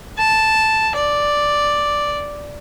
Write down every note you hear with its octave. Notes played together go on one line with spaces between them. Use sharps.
A5
D5